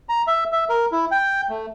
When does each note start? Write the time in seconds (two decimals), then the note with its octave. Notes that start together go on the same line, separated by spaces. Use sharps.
0.09 A#5
0.27 E5
0.53 E5
0.69 A#4
0.92 E4
1.11 G5
1.49 A3